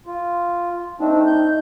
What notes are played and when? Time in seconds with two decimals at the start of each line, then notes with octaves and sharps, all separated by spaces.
0.06 F4
1.00 A3 C4 D4 D#4
1.27 G6